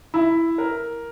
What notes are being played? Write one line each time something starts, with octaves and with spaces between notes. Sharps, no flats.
E4
A#4